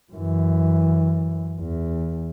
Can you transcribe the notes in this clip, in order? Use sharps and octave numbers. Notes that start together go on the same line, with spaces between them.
F#2 E3
E2